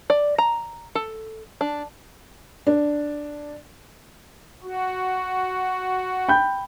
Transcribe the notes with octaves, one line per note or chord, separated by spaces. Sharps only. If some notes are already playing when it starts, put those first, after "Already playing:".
D5
A#5
A4
D4
D4
F#4
G5 B5 G6